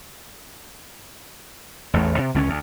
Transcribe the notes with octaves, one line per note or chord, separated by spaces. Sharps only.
A1 E2 A3
C3
C#2 D3 C4 C#4
D2